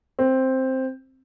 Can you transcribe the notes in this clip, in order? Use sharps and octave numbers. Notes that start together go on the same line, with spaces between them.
C4